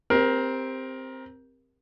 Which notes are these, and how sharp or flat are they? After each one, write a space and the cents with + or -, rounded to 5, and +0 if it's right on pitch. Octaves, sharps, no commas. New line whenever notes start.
C4 +0 G4 +30 A#4 +20